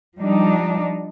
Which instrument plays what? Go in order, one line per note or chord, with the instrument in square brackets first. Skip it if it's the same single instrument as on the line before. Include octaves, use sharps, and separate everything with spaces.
[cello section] F3 G3 D4 D#4